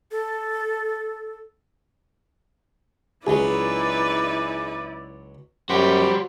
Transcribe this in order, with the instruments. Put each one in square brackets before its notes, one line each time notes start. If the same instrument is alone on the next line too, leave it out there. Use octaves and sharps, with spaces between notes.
[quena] A4
[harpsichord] C#2 F#3 [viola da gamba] D#4 B4 [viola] E4 D5 [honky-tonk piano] G#4
[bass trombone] F#2 [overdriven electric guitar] G3 F#4 [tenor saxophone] G4 [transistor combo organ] C5 B5 C6